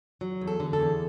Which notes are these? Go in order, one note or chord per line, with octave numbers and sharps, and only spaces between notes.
F#3
E2
A4
D3
A4
E2